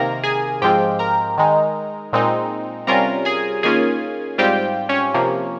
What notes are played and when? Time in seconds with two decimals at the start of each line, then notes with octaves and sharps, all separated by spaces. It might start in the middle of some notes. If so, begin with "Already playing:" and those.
Already playing: C3 D#3 A#3 A#4 A#5
0.23 G#4 G#5
0.62 G#2 F3 G#3 C4 F4 G4 G5
0.99 A#4 A#5
1.38 D#3 G#3 D#4
2.13 A#2 G#3 C4 D#4
2.87 C3 G3 C#4 F4 A#4 A#5
3.25 G#4 G#5
3.63 D#3 A#3 C#4 F4 G#4 G#5
4.38 G#2 G3 C4 F4 G4 G5
4.89 C#4 C#5
5.14 C3 F3 A#3